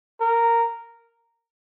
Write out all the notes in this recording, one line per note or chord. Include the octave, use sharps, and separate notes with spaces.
A#4